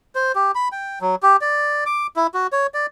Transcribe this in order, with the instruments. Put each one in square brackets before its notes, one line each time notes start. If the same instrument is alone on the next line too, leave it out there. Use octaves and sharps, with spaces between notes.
[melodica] C5
G4
B5
G5
F#3
G4
D5
D6
E4
F#4
C#5
D5